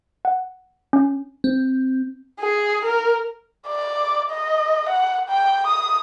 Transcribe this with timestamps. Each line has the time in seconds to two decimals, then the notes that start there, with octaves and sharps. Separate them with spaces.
0.25 F#5
0.93 C#4
1.44 C4
2.40 G#4
2.85 A#4
3.68 D5
4.31 D#5
4.89 F#5
5.29 G5
5.67 D#6